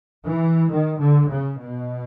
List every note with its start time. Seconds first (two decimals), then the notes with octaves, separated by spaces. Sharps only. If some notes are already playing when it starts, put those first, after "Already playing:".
0.26 E3
0.70 D#3
0.99 D3
1.29 C#3
1.58 B2